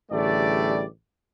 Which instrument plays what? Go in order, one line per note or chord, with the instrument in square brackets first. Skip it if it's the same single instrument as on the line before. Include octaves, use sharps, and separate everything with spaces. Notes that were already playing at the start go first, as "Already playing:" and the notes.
[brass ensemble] A1 D3 G3 A3 G#4 D5